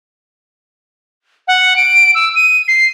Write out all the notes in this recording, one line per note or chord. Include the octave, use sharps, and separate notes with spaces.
F#5
D7
E6
D#7
C7